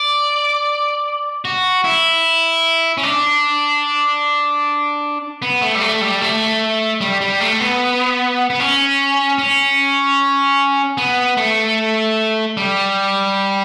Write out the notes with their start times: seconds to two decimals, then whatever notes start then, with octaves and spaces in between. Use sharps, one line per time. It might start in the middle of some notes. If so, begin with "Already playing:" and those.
Already playing: D5
1.45 F#4
1.84 E4
2.98 C#4
3.03 D4
5.42 B3
5.61 A3
5.75 G3
5.81 A3
6.01 G3
6.21 A3
7.01 G3
7.21 G3
7.41 A3
7.60 B3
8.50 B3
8.60 C#4
9.38 C#4
10.98 B3
11.37 A3
12.57 G3